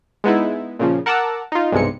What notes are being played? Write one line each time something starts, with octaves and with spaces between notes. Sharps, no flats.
G#3 B3 D#4 E4
A#2 C#3 F3
A#4 F#5 A5 A#5 D6 E6
D#4 F4
B1 G2 C3 G#3 C#7